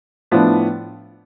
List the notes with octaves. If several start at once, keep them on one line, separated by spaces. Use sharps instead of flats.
A2 F3 B3 D4